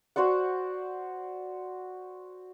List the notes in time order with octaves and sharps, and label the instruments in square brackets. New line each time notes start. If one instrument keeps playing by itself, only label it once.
[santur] F#4 C5 D5 F#5